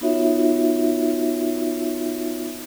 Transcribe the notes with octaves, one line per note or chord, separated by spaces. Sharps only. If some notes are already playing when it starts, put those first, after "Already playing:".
B3 D#4 F4 F#4 C#5 E5